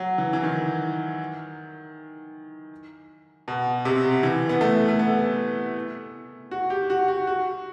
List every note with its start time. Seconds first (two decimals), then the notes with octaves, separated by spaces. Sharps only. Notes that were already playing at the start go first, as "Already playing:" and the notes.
Already playing: F#3
0.18 E3
0.33 E3
0.43 D#3
3.48 B2
3.85 C3
4.23 E3
4.49 B3
4.61 A3
4.88 A3
4.99 B3
6.51 F#4
6.70 G4
6.90 F#4
7.08 F#4
7.27 F#4